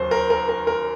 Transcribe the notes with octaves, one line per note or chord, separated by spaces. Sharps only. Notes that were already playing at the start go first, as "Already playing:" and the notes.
Already playing: D#2 C#3 F#3 C5
A#4
A#4
A#4
A#4